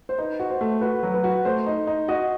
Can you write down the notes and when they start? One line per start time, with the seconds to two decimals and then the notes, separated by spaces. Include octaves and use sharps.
0.09 C5
0.18 D#4 B4
0.40 F#4
0.50 C5
0.61 A3
0.81 F#4 B4
1.03 F#3
1.14 B4
1.24 F#4
1.45 A3 C5
1.67 D#4
1.87 D#4
2.08 F#4 D#5